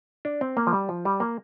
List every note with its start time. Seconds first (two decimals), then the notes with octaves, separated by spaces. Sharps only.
0.25 D4
0.41 C4
0.57 A#3
0.67 F3
0.73 G3
0.89 F3
1.05 G3
1.20 A#3